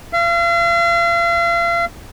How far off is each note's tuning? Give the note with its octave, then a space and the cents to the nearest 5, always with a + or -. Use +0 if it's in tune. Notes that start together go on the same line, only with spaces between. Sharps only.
F5 -40